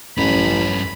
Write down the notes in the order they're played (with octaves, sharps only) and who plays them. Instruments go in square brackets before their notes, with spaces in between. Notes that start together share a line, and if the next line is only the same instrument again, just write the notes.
[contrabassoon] A1 [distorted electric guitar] G2 C#4 [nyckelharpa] B5